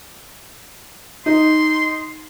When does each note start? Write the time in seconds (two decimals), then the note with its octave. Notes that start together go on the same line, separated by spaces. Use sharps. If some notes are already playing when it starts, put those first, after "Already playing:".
1.26 D#4 C6